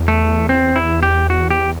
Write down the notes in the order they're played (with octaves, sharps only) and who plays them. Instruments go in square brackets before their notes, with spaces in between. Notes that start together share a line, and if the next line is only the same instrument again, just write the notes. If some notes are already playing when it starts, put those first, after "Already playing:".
Already playing: [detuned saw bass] E2
[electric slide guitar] A3
C4
E4
G4
F#4
G4